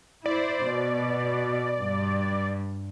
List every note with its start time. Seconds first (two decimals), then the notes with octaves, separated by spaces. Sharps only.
0.26 E4 C5 D5
0.66 B2
1.81 G2